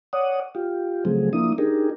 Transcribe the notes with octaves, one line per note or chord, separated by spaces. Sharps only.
C#5 D5 F#5 D#6
F4 G4
C#3 F3 F#3 A3 C4 G#4
F3 A#3 D4 E4 D#6
D4 D#4 G4 G#4 A#4